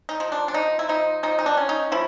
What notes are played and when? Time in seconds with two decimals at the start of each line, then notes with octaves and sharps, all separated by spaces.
0.09 D#4
0.20 F3
0.32 D4
0.48 D4
0.54 F3 D#4
0.79 E4
0.89 F3 D#4
1.23 F3 D#4
1.39 D#4
1.46 D4
1.57 C#4
1.69 D#4
1.92 F3 E4